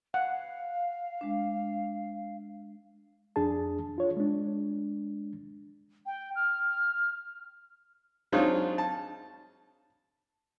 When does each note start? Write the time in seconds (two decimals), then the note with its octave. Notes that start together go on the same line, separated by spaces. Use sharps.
0.14 F5 F#5
1.21 G#3 D4
3.36 F2 D4 G#4 A5
3.98 F4 C#5
4.17 G#3 D4
6.06 G5
6.36 F6
8.32 F#3 G#3 C4 D4 D#4 F4
8.78 A5